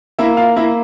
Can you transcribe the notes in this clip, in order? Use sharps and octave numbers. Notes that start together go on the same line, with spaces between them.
A#3 E4 E5
F4 F5
A#3 E4 E5